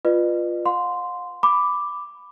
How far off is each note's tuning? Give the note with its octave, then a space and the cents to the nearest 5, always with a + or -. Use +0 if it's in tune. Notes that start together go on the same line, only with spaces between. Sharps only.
F4 +0 B4 +0 D#5 -45
F5 +45 C6 -10
B5 +10 D6 +0